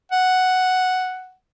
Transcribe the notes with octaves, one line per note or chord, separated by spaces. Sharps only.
F#5